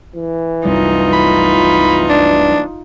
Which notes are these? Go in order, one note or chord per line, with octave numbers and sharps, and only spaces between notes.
E3
C2 F#2 G3 D#4 F4
B5
D4